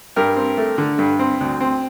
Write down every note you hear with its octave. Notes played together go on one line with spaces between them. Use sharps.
G2 G4 A#4
C4
A3
D3
G2
C4
D2
C4